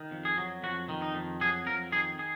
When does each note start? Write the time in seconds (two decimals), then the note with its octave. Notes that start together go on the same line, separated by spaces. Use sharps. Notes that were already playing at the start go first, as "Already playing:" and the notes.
Already playing: D#3
0.11 F2
0.25 G#4
0.38 F#3
0.63 F2 F#4
0.89 D#3
1.02 D#4
1.15 F2
1.41 F#3 G#4
1.66 F2 A#4
1.92 D#3 G#4
2.19 G#4